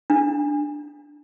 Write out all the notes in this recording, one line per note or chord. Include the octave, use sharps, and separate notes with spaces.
D4